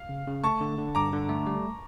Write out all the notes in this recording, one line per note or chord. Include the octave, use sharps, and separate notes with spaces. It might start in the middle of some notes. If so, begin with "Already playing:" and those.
Already playing: F5
C#3
C#3
A3 A5 C#6
D3
D3
G2 A#5 D6
D3
A3
G3